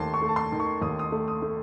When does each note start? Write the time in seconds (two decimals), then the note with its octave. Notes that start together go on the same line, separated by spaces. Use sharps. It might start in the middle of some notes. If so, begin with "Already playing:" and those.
Already playing: D#2 A3 A5 C6
0.14 C#6
0.22 A3
0.29 A5
0.36 C6
0.52 D#3
0.60 C#6
0.82 D#2 D#6
0.99 D#6
1.12 A3
1.28 D#6
1.42 A3